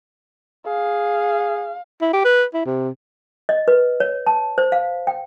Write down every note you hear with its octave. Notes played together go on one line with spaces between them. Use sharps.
G#4 F5
E4
G4
B4
E4
C3
D#5
B4
C#5
A5
C5
F5
G5